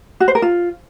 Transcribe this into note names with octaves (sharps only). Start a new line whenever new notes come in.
F#4
C5
A#4
F4